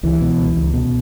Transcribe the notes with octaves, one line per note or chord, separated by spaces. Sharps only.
C#2 E3
B2
C#2
C#2
B2